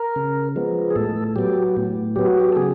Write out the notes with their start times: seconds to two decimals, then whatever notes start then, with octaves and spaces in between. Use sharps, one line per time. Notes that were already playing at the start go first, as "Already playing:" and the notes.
Already playing: A#4
0.16 C#3
0.56 F3 G#3 B3
0.90 G#4
0.96 A2 A4
1.36 F#3 B3 G4
1.77 A2
2.16 F#3 B3 G4
2.27 F#4
2.40 G4
2.52 A4
2.56 C#3 G#4